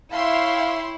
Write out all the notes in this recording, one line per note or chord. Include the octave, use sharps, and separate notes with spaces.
E4 C#5 E5 F5 G5 C6